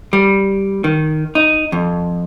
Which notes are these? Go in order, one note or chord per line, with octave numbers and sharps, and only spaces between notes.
G3
D#3
D#4
F2